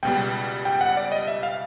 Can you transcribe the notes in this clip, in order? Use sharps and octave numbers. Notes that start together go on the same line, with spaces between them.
C#2 B2 G3 G5
G5
F#5
D5
D#5
E5
F5